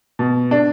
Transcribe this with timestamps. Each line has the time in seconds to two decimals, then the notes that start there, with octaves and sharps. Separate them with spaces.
0.19 B2
0.51 D4